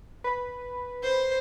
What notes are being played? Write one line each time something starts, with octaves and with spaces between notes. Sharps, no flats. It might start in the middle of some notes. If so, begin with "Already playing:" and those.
B4
C5